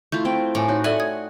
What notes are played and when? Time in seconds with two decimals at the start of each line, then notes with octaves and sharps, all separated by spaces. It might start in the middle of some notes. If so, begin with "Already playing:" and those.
0.12 A3 E4 F4 C#6 G6
0.25 C4 G5
0.55 A2 G#5 D6
0.69 D#4 F#4 C#5 C6
0.84 A4 D5 E5 F#5 G#5
1.00 D#6 G#6